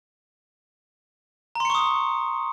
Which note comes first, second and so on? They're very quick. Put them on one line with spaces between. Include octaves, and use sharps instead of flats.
A#5 C6 C#7 C#6 D#6